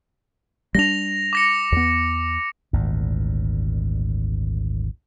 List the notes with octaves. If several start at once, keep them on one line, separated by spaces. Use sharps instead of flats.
G3 A3 D4 A#6 F7
D6 A#6 C#7
E2 B3
G#1 D2 A#2